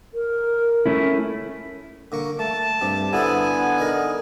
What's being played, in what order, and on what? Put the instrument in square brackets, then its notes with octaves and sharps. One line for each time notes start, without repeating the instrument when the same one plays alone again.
[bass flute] A#4
[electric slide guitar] A3 C#4 E4
[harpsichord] D3 A#3 C#6
[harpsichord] A3 [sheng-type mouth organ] A5
[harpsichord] G2 G3 [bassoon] C3
[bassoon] D3 [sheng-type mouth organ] B3 G#5 [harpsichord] E4 G#4 A4
[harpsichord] D#4 G#4 A#4